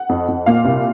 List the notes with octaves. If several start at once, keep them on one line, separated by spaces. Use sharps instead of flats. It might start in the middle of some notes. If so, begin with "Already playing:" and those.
Already playing: F#5
F2
F2
A#2 F5
C2